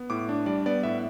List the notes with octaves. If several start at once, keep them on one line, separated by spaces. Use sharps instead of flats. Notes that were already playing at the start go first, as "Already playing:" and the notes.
Already playing: B3
A2 D6
D4
G3 D5
B3 D5
A2 E5